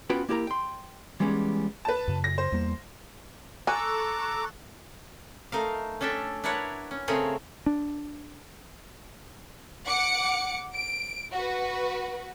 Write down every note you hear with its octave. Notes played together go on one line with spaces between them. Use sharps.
B3 C#4 F4 F#4 B4 G5
A#3 E4 G4 A#4 A#5
G5 C6
E3 G3 G#3 B3 C#4
B4 A5
F#2 C#3
A#6
C5
E2 G3 A#3
A4 G#5 A#5 C#6 D6 E6 F#6
A3 D#4 A#4 F5
C#4 D4 A4 E5 G5
D4 E4 A#4 B4 C#5 F#5
C#4
C#3 A3 C4 G#4 A#4 C#5
D4
F#5 D6 C#7
D7
F#4 B4